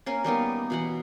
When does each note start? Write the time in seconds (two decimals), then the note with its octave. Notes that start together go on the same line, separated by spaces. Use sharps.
0.06 A#3 C#4 A#4
0.24 G3 A#3 B3 D#4
0.70 B2 E3 F#5